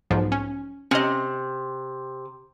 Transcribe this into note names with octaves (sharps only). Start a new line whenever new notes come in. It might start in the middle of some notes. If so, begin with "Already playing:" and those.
B1 G#2 F3
C#4
C3 C#4 D#5